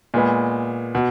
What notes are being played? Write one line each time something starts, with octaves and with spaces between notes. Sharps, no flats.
A#2 G#3 B3
B2